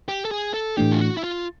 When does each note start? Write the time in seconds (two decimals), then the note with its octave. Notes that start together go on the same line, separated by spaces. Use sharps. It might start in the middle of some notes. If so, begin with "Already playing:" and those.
0.08 G4
0.25 A4
0.31 G#4
0.54 A4
0.77 A2 E3 A3 D4 G4
0.92 F4
1.01 F#4
1.17 E4
1.24 F4